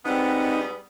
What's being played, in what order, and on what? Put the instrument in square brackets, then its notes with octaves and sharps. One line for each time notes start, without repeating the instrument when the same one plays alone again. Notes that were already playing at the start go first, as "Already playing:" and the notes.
[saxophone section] G#2 G3 B3 [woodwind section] C4 [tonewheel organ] D#4 [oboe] F#5